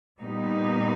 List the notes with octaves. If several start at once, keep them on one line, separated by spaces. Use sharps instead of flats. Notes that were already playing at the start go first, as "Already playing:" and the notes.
A#2 G3 B3 D#4